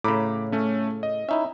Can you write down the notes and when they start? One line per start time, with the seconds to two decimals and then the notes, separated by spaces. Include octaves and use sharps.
0.04 A2 C#3 A#5 B5 D6
0.52 A3 C#4
1.03 D#5
1.29 C#4 D#4 E4 E5